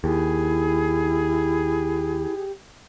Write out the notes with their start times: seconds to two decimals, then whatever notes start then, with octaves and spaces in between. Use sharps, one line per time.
0.04 D#2 E4 G4 G#4